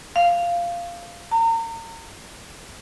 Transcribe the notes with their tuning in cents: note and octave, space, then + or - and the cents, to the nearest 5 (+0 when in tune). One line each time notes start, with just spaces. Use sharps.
F5 -10
A#5 -35